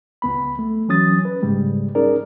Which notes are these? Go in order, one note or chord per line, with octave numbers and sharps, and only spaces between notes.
C#2 B3 B5
A3
E3 F#3 C#4 D#6 A6
B4
G#2 C#3 G3 G#3
C#4 D#4 G#4 A#4 D5